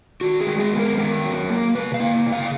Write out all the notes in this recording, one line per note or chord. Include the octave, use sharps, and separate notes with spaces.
D#3 F#4
G#4
G#3
G#4
B3
A#4
D#3 A#4
F#3
A#3
C#3 B4
F5
A#3
C#3
F5